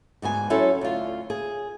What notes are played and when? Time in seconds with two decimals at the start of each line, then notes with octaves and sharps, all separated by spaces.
0.22 D2 G#2 B3 G#5
0.50 F#3 C#4 E4 A4 C5 C#5
0.81 D2 F4
1.30 G#4